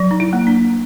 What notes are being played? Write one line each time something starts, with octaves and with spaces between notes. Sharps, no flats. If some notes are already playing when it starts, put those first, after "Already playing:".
Already playing: F#3
D#4
E4
A#3
D4